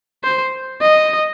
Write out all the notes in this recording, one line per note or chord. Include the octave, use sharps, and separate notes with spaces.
C5
D#5